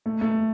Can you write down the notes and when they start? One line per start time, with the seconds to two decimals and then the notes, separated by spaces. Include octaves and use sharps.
0.06 A3
0.21 A3